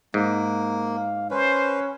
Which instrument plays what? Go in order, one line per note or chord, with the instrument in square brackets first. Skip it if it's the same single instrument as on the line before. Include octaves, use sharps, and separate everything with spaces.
[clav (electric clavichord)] G#2 [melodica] A#3
[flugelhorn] F5
[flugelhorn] C#4 [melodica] B4 [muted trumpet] C5